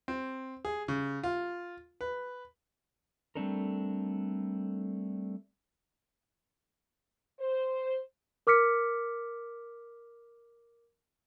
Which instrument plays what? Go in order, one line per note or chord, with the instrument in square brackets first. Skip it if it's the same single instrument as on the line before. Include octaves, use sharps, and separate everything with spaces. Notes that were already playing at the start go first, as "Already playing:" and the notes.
[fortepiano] C4
G#4
C#3
F4
B4
[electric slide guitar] G3 A3 C4 D4 A4 A#4
[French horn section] C5
[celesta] A#4 D6 F6 B6 C#7